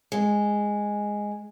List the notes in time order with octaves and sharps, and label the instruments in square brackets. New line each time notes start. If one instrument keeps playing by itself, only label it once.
[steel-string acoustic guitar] G#3